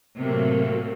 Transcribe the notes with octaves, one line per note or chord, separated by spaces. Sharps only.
A2 C3 F#3 A3 A#3